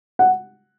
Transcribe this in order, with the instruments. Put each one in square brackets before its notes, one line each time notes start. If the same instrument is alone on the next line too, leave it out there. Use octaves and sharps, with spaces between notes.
[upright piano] F#5